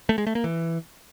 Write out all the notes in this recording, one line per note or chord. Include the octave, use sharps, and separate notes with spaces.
A3
G#3
A3
A#3
E3